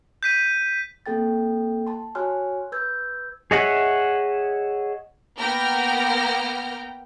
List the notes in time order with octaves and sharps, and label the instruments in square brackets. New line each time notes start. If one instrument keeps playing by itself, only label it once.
[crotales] G6 B6 D#7
[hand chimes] A#3 C4 A4 G5 A6
A5 C6
F#4 C#5 G#5 C6 F6 F#6
B4 E6 G6 G#6
[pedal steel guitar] G#4 C#5 D#5 E5 F#5
[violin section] A#3 B3 A#4 G5 F6 A#6